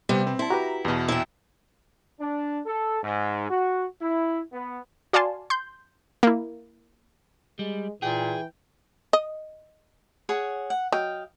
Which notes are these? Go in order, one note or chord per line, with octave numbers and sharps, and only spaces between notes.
C3 G3 B3
C4 B4
E4 A5 C6
F#4 G4 B4 A#5
E2 B2
A#2 E4 G5
D4
A4
G#2
F#4
E4
B3
F#4 D5 F5 G#5 A5 C6
C6 G6
A#3 E4
G3 G#3
A#2 E3 G#4 G5
D#5
G#4 C#5 F#5
F#5
F#3 D#5 F5 G5